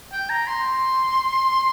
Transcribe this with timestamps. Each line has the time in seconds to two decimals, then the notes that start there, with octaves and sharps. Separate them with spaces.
0.12 G5
0.30 A#5
0.47 C6